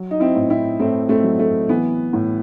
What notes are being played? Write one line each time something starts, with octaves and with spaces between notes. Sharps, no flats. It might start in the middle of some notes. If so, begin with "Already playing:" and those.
Already playing: F#3
D#4
C4 E4
A2
C4 E4
A2 A3 C4
A3 C4
F#3
A3
E3 B3
A2